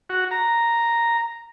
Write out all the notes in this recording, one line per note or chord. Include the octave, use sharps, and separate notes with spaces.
F#4
A#5